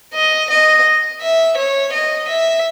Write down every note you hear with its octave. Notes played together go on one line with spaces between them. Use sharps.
D#5
D#5
E5
C#5
D#5
E5